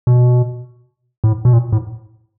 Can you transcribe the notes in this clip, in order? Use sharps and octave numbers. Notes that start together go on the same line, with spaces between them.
B2
A2
B2
A#2
A2